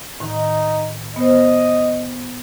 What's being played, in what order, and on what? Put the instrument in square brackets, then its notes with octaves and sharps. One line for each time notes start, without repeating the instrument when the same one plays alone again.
[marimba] A2 D#3 [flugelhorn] D#4
[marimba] B3 C5 [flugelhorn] D#5